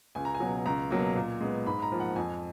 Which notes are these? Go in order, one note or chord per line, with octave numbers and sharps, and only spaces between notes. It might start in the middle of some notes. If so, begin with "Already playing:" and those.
C#2 G#5
A#5
G#5
B2 F#3
C#2 A#5
B2 F#3 A#3
A#2
G#3 B3
G#2 B5
A#5
F3 A#3
F#5
F2 G#5